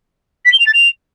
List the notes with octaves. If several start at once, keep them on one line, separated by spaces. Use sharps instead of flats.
B6
G7
F7
A6
F7